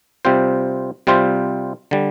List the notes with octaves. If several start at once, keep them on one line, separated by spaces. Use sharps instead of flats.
C3 G3 C4 F4 C5
C3 G3 C4 F4 C5
D3 G3